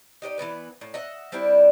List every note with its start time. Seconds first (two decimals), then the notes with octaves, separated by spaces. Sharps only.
0.22 D#4 G4 C#5 D#5
0.38 E3 G#3 B3 B4
0.81 A2
0.94 D#5 E5 F#5
1.32 G3 C4 D4 E4